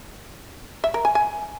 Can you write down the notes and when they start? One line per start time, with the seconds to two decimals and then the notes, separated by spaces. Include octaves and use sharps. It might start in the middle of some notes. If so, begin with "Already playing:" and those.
0.84 E5
0.94 A#4
1.05 G#5
1.15 G#5